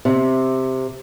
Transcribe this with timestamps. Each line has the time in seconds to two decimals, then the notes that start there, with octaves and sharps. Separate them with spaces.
0.05 C3